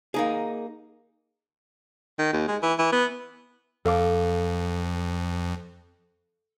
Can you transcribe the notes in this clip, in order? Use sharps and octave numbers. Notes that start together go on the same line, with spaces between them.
A#3 D#4 G#4
D#3
D#2
G#3
E3
E3
B3
F2 A4 F5 D6